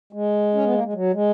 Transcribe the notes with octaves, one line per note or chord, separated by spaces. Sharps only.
G#3
C#4
B3
A#3
G#3
F#3
G#3